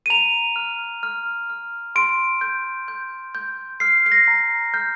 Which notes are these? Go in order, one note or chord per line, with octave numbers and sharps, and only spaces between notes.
D#7
A#5 F7
F6
F6
F6
C6 D7
G6
G6
G6
F6 C7
C7
A#6
A#5
F6 G6